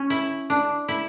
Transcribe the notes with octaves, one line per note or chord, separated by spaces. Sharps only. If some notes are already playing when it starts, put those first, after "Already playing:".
Already playing: C#4
E4
D4
E4